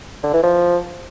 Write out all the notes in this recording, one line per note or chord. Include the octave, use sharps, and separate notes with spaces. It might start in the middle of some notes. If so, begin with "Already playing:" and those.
D3
E3
F3